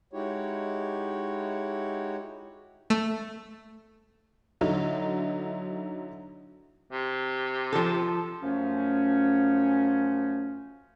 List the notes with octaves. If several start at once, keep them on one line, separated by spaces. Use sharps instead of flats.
G#3 D#4 E4 F#4 G4 C#5
A3
D3 F#3 D#4 E4
C3
F3 A4
F#2 F3 A3 C#4